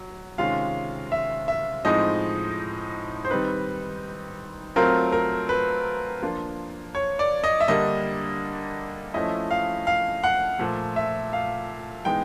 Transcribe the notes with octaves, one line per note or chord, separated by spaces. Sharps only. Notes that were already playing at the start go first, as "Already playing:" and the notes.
Already playing: F#3
C3 D#3 G#3 C#4 F4 F5
E5
E5
A2 F3 G#3 C4 D#4 D#5
C5
D#3 G3 C4 D#4 B4
F#3 A3 C4 F4 A#4
A#4
B4
F3 A#3 D4 F4
C#5
D5
D#5
E5
D3 G3 A#3 D4 D#5
F3 A3 C#4 E4 D#5
F5
F5
F#5
A#2 F3 A3
E5
F5
E3 G#3 B3 D#4 G5